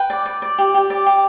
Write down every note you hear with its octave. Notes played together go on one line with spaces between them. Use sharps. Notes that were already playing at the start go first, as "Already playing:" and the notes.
Already playing: B4 G5
D5
D5
D5
G4
G4
D5
G4